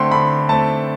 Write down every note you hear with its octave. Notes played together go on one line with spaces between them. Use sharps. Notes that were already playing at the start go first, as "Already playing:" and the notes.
Already playing: D3 A3 C4 G5 C6
D3 B5
A3 C4 A5